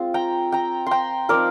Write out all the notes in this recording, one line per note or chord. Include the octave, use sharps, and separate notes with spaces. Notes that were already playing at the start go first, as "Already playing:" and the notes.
Already playing: G#3 C4 F4
G5 A#5
G5 A#5
G5 A#5 C6
F3 C4 D#4 A#4 D5